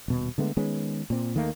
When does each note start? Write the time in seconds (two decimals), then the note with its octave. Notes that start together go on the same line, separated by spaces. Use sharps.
0.08 D#1 B2
0.38 D3 G#3 A3 B3
0.57 D#3 G#3 B3 C#4
1.10 A#2 C4
1.35 D#2 D#3 A3 A#3